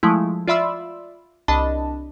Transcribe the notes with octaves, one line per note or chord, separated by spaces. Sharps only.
F3 G#3 A3 E4
F4 D5 E5 B5 C6 E6
C2 D4 D#5 A5 B5